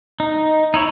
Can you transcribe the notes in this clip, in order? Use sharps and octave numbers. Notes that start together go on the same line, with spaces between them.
D#4
D#4 E4 C#5